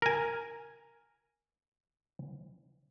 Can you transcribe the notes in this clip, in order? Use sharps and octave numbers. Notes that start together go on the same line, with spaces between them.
A#4 G#5